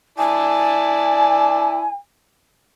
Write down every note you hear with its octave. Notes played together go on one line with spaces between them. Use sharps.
E4 D5 G#5 A5